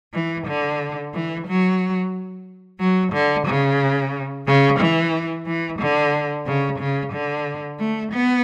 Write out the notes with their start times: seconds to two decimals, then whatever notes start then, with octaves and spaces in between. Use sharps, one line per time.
0.14 E3
0.47 D3
1.14 E3
1.48 F#3
2.80 F#3
3.13 D3
3.47 C#3
4.46 C#3
4.79 E3
5.46 E3
5.80 D3
6.46 C#3
6.79 C#3
7.13 D3
7.79 A3
8.13 B3